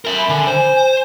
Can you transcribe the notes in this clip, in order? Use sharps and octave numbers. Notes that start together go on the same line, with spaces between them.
A#4 E5
B5
D3 G#5
C5 G#5
G#5